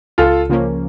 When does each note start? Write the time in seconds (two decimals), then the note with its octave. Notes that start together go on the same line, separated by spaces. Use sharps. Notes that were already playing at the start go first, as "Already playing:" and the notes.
0.18 C#2 F4 A4
0.49 C#3 F3 A#3 C#4